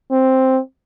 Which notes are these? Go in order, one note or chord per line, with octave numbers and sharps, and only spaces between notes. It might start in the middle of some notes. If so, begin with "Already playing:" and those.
C4